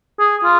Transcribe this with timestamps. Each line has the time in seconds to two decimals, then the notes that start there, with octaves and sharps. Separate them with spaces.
0.19 G#4
0.44 F4